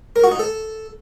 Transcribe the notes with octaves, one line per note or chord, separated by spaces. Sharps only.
A#4
F#4
D#4
A4